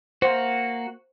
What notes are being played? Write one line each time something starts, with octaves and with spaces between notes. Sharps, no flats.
A#3 F#4 C5